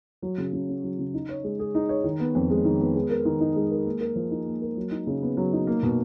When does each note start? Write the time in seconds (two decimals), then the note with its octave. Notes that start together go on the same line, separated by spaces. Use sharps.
0.22 F#3
0.38 C#3
0.53 C#3
0.69 C#4
0.84 F#3
0.99 C#3
1.14 D#4
1.29 C#5
1.44 G#3
1.59 G#4
1.75 D#4
1.89 C#5
2.04 D#3
2.20 B3
2.35 F2
2.50 G#3
2.65 D#3
2.80 B3
2.95 G#3
3.10 A#4
3.25 D#3
3.41 D#4
3.56 G#3
3.71 A#4
3.86 A#3
4.01 A#4
4.16 F3
4.31 D#4
4.47 A#3
4.62 A#4
4.77 F#3
4.91 D#4
5.07 C#3
5.22 B3
5.37 F#3
5.53 D#4
5.67 A#3
5.83 B2